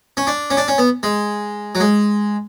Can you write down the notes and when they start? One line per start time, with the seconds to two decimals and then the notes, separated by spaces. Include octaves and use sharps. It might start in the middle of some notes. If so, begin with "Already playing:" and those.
0.17 C#4
0.27 D4
0.50 C#4
0.57 D4
0.68 C#4
0.78 B3
1.03 G#3
1.75 F#3
1.80 G#3